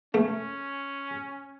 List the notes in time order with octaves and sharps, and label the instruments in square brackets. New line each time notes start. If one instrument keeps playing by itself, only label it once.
[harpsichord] A3 [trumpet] C#4